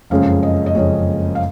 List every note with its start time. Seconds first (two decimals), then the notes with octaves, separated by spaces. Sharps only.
0.10 F#1 F2 C#3 G#3 C#4 F5
0.43 D#5
0.66 D#5
0.75 F#1 F2 C#3 G#3 C#4 C#5
1.35 F5